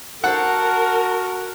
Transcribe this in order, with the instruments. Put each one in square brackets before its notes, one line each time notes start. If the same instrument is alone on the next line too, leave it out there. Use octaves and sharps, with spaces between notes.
[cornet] F#4 [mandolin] A4 [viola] A#4 [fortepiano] C5 F#5